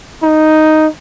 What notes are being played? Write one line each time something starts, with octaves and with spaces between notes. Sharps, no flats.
D#4